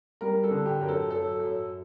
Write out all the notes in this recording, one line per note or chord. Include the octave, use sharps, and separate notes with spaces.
G3 A#4
A4
D3
G4
F#2 A#4
A4
F#2 A4
F#2